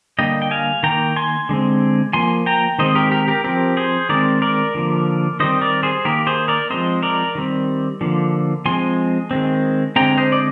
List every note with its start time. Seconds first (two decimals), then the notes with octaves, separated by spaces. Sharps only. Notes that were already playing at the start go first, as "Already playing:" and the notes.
0.19 D3 G3 A#3 D#5 G5
0.42 G5
0.51 F5 G#5
0.83 D#3 A#3 G5 A#5
1.16 G#5 C6
1.49 D3 G#3 C4
2.13 F3 A#3 G#5 C6
2.46 G5 A#5
2.79 D#3 G#3 C4 C5 D#5
2.95 G4 A#4
3.11 G4 A#4
3.28 G4 A#4
3.44 F3 C4 G4 A#4
3.77 G#4 C5
4.09 D#3 G#3 C4 A#4 D5
4.42 A#4 D5
4.75 D3 F3 A#3
5.40 D#3 G3 C4 C5 D#5
5.61 A#4 D5
5.83 G#4 C5
6.05 D#3 A#3 G4 A#4
6.27 G#4 C5
6.48 A#4 D5
6.70 F3 G#3 C4 C5 D#5
7.03 A#4 D5
7.35 D#3 G3 C4
8.01 D3 F3 A#3
8.65 F3 G#3 C4 G#5 C6
9.31 D#3 G#3 C4
9.96 D3 G#3 C4 G5 A#5
10.18 C5 D#5
10.32 D5